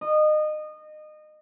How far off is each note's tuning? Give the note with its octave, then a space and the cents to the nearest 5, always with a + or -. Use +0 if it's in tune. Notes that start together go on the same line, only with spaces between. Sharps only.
D#5 -25